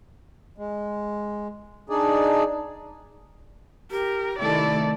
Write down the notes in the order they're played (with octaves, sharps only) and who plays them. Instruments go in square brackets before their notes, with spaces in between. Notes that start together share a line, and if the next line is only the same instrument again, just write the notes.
[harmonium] G#3
D4 D#4 G#4 D5
[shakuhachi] G4 [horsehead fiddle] A#4
[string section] C3 D#3 A4 [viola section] A3 E4 [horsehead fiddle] D5